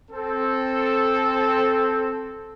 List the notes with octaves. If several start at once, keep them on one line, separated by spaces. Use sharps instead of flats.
C4 A4